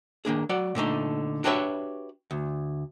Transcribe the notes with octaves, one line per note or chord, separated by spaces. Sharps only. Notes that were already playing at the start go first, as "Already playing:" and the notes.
D#3 A#3 D4 G#4
F#3 D5 F#5
A#2 D3 A3 D#4
D4 F#4 G4 B4 C#5 E5
D2